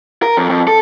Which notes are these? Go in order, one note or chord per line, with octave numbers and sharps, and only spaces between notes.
A#4
F2
F2
A4